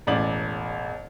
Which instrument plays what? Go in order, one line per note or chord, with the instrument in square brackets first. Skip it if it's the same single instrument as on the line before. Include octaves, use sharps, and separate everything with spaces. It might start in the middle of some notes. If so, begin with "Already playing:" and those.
[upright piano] E1 A1 D5 F#7